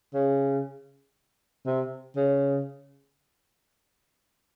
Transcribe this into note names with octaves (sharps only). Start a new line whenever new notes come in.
C#3
C3
C#3